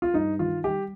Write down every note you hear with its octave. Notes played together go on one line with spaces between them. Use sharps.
F4
G2 D#4
D#3 F4
G3 G4